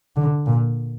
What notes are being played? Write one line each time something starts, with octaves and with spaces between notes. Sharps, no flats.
D3
A#2